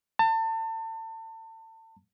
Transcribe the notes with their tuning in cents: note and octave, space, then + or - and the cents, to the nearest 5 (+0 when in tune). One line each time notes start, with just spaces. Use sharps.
A5 +35